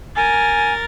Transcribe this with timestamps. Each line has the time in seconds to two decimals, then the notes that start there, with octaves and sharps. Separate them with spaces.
0.16 A#4 G#5 A6